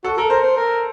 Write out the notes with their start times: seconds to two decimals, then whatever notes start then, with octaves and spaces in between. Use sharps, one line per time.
0.04 F#4 A4
0.17 A4 A#4
0.30 A#4 C5
0.43 C5
0.57 A#4